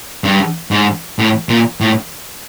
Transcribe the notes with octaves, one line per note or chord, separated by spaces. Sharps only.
G2
G#2
A2
A#2
A2